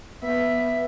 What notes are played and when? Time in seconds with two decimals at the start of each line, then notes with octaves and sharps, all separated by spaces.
0.23 B3 E5